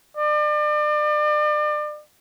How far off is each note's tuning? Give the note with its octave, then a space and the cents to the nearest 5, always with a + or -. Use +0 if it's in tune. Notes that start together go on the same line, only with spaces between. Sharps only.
D5 +35